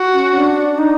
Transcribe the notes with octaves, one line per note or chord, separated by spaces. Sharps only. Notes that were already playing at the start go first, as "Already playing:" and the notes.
Already playing: F#4
C#4
D4
D#4